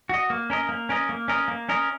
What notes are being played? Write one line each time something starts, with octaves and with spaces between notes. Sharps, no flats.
F#4 D#5
A#3
C#4 A#4 D#5
A#3
C#4 A#4 D#5
A#3
C#4 A#4 D#5
A#3
C#4 A#4 D#5